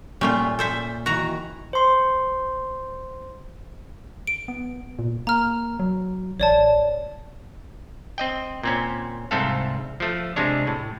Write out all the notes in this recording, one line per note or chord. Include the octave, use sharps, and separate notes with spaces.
A#2 G3 A3 C#4 F4
A4 C5 E5
D#3 E3 F#4 A#5
C5 C6
D7
B3
A#2
A#3 A#5 F6
F#3
A1 C#5 D5 A5
C4 D#5 G5
A#2 C4 C#4
C2 G#2 A3 C4 A4 F5
F3 A3
C3 G#3 D4 C#5
A2